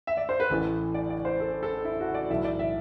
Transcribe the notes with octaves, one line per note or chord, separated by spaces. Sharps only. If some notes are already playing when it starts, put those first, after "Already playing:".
E5
D5
C5
B4
A1 A2 E3 A4
D5
D5
C5
A4
A4
E4
F#4
D5
B1 A2 E3 E5
D5
E5